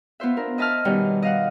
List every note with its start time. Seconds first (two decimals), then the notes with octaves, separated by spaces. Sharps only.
0.20 B3 F4 C5 E5
0.37 D4 A#4
0.58 D#5 E5 A5 D#6 F6
0.85 B2 D#3 G3 C#4
1.22 D#5 F5 F#5